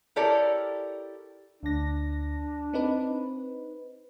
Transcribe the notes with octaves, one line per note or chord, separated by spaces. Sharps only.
E4 G4 A4 A#4 C#5 D5
D2 D4 A#6
C4 D#4 B4